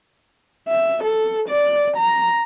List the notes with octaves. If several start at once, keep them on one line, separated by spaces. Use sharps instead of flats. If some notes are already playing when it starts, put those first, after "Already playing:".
E5
A4
D5
A#5